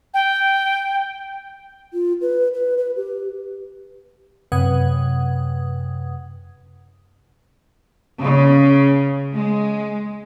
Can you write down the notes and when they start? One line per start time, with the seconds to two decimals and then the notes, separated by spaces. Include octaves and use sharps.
0.14 G5
1.93 F4
2.21 B4
2.54 B4
2.78 B4
2.96 G4
4.52 F#2 C3 B4 F#5 D#6 G#6
8.22 C#3
9.34 G#3